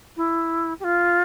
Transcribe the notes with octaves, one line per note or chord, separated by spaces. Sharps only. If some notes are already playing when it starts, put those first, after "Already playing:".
E4
G4
F4